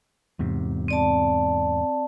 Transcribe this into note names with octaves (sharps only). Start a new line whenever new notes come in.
E2 G#2 C3
C4 D5 A5